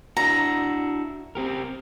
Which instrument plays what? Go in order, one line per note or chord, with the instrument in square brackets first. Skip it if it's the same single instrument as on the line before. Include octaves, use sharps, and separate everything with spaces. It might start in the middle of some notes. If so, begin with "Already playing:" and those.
[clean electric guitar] D4 E4 F#4 [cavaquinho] A#5
[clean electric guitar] C4 G4 A#4